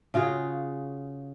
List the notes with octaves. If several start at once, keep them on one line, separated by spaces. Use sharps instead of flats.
C#3 F4 F#4 G#4